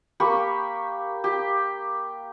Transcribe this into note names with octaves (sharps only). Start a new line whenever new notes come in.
A#3 G4 B5 C#6
G4